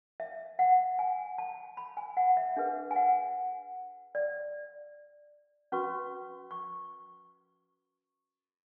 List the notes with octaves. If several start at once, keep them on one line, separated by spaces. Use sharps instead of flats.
E5
F#5
G#5
A5
B5
G#5
F#5
E5
D4 G#4 B4 E5
G#5
F#5
D5
C#4 F#4 B4 C#6
C#6